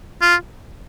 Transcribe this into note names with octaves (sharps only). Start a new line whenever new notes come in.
F4